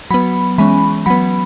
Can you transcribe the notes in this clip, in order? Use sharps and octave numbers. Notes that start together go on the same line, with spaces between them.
F#3 B3 B5
E3 G#3 C#4 B5
F#3 B3 B5